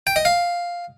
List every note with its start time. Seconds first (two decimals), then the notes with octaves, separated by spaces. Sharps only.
0.07 G5
0.16 D#5
0.25 F5